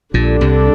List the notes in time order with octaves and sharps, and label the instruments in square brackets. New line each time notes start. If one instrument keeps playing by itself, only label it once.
[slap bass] A#1 A#2 [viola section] D3 G3 D4 A4
[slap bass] C2 C3